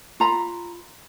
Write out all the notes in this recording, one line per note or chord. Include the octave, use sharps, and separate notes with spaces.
F4 A#5 B5